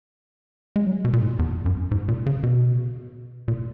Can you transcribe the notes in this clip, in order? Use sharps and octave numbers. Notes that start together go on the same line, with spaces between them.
G#3
F#3
B2
A#2
G#2
E2
F#2
G#2
A#2
C#3
B2
A#2